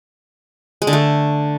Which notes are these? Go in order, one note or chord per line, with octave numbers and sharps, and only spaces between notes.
G#3
D3
A3